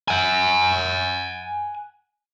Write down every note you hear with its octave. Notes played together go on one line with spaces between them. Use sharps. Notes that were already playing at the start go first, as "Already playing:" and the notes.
F#5 G#5